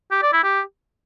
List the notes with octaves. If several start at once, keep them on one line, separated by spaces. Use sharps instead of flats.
G4
D5
E4
G4